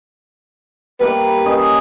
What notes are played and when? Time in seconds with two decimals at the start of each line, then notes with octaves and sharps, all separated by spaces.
1.00 G3 A#3 E4 B4
1.45 C#4 D#5